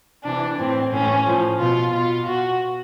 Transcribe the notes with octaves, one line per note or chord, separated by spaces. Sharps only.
C3 E3 D4
A2 E3 C4
A2 E3 C#4
A2 F3
B2 F4
B2 F4
B2 F#4